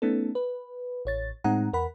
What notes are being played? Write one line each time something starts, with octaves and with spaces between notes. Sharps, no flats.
A3 B3 C#4 D#4 A4
B4
A1 C#5 A6
A2 G#3 C4 D#4 F#5 A#5
E2 A#4 F#5 B5